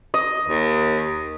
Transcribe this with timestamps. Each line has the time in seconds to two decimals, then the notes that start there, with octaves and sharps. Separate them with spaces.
0.14 D#5
0.48 D#2